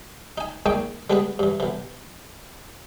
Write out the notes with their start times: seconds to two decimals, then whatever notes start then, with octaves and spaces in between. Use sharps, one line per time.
0.38 D#4 G#5
0.66 A#2 G#3 D#4 G5 G#5 C#6
1.10 G3 G#3 B3 G#4 B4
1.39 G2 E3
1.60 B1 E3